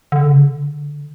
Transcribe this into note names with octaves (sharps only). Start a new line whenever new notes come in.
D3
C#3
D3